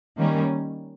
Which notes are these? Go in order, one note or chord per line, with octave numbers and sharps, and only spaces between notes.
D#3 G3 A#3 C#4